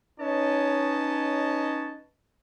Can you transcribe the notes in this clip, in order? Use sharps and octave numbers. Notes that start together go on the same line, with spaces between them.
C#4 D#4 B4 C#5 D#5 A5